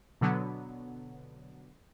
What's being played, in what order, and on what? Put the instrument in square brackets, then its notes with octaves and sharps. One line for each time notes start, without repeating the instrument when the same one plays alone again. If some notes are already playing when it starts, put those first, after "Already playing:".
[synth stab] B2 D3 F#3 B3